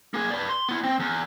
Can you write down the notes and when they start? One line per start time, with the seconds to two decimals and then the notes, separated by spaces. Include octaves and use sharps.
0.14 A#3 G#4
0.31 B4 D5
0.49 C6
0.69 B3 E4
0.83 C4
0.99 E2